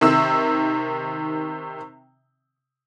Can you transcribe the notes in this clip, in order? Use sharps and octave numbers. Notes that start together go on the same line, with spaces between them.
C3 D#3 E6